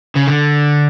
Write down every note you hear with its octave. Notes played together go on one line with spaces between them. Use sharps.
C#3
D3